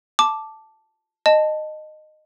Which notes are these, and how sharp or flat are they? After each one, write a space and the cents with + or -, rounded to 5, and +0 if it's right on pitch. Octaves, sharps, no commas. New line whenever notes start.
A5 +0 D6 +0
D#5 -15 A5 +0